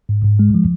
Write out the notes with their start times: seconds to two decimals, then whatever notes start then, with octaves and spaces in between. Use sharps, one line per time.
0.09 G#2
0.24 G#2
0.39 G#3
0.54 F3